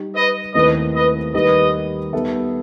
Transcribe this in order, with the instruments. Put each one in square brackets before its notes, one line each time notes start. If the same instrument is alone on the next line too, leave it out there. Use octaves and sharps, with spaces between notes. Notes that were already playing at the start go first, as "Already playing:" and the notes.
Already playing: [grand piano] G3 D#4 G4
[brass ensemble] B4 D#5
[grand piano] D#2 D#3 A3 C4 E4 [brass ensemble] B4 D#5
[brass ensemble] B4 D#5
[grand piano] D#2 D#3 G3 D#4 [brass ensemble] B4 D#5
[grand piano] G3 B3 D#4 A4 E5